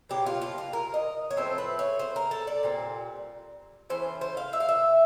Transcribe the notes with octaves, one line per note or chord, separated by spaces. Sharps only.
B2 F#3 A#3 G4
F4
F4
F4
A#4
D#5
C#5
A2 F3 A3 C4 C5
B4
C#5
C5
A#4
A4
D5
A#2 G3 C4
E3 A3 C#4 C5
C5
F5
E5
F5
E5